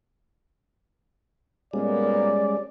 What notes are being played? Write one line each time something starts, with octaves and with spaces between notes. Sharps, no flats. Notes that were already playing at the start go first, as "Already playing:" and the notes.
A#2 G3 G#3 A#3 B3 C#4 D5